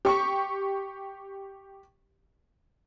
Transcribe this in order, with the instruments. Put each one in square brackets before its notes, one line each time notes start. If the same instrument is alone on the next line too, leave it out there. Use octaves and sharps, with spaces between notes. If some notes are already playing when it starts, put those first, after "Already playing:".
[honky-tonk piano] G4 C#6